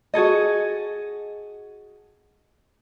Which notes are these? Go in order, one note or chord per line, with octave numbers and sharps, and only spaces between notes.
F#4 G#4 A4 D#5